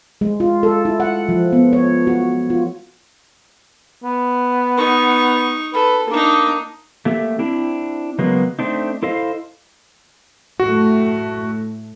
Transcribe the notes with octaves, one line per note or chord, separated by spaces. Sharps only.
G#3
F4
A4
E4
F#5
F3
B3
C#5
F#4
F4
B3
D#4 C#6
A4 B4
A#3 D4 D#4
A3 A#3 G4 A4 E5
C4 D4 E4
C#3 F#3 G#3 A#3 B3
A3 C4 D4 D#4
E4 A4 C5 D#5 F5
A2 A3 F#4